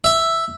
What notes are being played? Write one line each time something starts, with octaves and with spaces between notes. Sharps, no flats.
E5